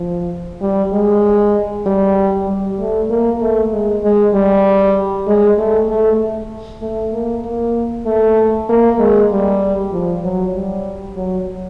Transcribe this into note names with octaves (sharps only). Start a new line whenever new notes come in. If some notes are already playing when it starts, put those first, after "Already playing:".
Already playing: F3
G3
G#3
G3
G3
A3
A#3
A3
G#3
G#3
G3
G#3
A3
A3
A3
A#3
A#3
A3
A#3
G#3
G3
F3
F#3
G3
F#3